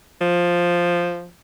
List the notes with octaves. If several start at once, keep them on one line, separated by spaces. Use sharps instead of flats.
F3